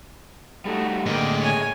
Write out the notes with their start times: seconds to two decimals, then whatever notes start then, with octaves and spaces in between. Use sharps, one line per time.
0.65 G3 A3 D#4 F#4
1.06 A2 D3 A#3 G#4 A4 D#5 G5
1.41 C#5 G#5